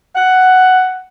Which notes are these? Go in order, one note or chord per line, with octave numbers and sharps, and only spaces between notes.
F#5